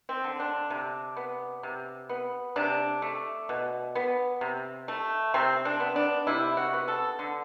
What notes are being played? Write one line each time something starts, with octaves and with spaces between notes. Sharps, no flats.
C4
D3
D4
C3
B3
C3
B3
C3 D4
A3
B2
B3
C3
A3
C3 C4
D4
B3
D4
C3 E4
F#4
B3
A4
D3